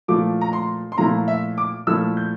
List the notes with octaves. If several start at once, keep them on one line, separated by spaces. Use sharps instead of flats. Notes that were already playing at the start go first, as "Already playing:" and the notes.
A#2 F3 A3 E4 D6
A#5
C6
C6
A#2 F3 A3 E4 A#5
E5
D6
A#2 F3 A3 E4 E6
G6